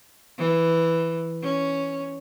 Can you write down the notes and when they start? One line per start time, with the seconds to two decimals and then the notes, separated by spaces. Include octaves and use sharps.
0.38 E3
1.42 C#4